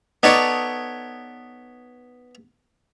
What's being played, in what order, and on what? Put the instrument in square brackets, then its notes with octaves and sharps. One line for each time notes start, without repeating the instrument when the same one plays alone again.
[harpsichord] B3 C#5 D5 [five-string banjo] D#4 A4